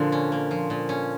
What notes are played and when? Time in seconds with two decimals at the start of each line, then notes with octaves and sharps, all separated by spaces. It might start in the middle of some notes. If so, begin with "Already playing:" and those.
Already playing: A#2 D3 F3 A#3
0.12 C#4
0.32 A#3
0.51 F3
0.70 A#2
0.89 C#4